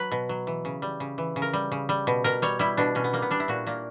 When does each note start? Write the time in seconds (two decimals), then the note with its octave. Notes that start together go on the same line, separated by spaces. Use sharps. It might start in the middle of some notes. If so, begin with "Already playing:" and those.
Already playing: F#3 B4
0.11 B2
0.29 F#3
0.47 E3
0.65 C#3
0.82 G3
1.00 C#3
1.18 E3
1.36 C#3
1.42 A#4
1.53 G3
1.72 C#3
1.89 G3
2.07 B2
2.24 B2 A#4
2.42 G3 C#5
2.59 G3 E4
2.77 B2 D4
2.95 B2 C#4
3.04 B3
3.13 G3 A#3
3.22 B3
3.31 G3 D4
3.40 E4
3.48 A#2 F#4
3.67 A#2 A#3